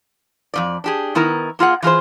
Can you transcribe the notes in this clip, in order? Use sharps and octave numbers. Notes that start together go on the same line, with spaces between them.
F2 C#3 D5
D4 G4 G#4
D#3 B3 E4 A#4 A#5
A#3 F4 G#4 F#5
E3 F4 G#4 C5